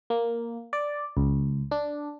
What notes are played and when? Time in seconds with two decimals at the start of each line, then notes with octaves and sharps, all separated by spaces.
0.10 A#3
0.73 D5
1.17 C#2
1.71 D4